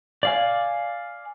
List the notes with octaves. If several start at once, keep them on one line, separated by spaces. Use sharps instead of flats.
D5 F5 G#5